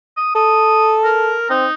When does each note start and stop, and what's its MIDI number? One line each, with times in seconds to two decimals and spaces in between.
0.17 0.32 87
0.35 1.36 69
0.35 0.98 87
1.04 1.46 70
1.50 1.66 60
1.50 1.74 63